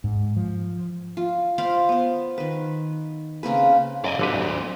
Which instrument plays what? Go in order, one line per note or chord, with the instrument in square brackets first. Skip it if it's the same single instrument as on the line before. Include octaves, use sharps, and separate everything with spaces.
[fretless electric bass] G#2
F3
[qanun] F4
C5 D5 F5 B5
B3 C5
D#3 B4
C#3 A#3 C4 B4
[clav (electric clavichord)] F#2 G#5 [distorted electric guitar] D5 D#5
[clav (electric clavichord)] G1 D3 B4 [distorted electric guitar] F#3 C4
[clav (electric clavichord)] D2